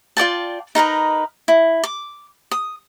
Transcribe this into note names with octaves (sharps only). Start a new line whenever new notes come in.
F4 D5 G5 A5
D#4 A#4 B4 D#5
E4
D6
D#6